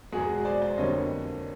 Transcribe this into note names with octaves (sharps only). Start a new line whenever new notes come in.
E2 B2 G#3 F#4 G#4
C5 D5
C5 D5
F2 D3 G3 A#3 C#5 D#5